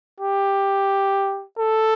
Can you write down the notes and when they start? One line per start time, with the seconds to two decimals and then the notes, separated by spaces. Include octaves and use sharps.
0.20 G4
1.58 A4